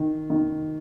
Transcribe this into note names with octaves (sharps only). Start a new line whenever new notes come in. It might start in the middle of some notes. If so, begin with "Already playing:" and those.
Already playing: D#3
D#3